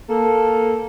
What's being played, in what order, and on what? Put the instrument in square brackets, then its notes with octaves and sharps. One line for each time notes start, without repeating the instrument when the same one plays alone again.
[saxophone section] A#3 A4